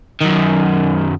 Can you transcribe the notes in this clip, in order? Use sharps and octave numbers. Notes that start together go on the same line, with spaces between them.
F#2 D#3